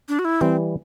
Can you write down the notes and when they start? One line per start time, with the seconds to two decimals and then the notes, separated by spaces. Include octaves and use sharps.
0.09 D4
0.19 F#4
0.25 E4
0.41 E3 G3 C4